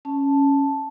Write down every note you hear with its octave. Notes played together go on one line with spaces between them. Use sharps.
C#4 A5